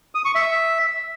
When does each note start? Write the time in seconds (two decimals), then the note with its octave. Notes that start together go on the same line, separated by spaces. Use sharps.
0.15 D#6
0.25 C#6
0.35 E5